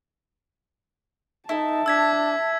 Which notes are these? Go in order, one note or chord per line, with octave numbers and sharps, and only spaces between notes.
D#4 E4 A4 A5
D4 E6 G#6 B6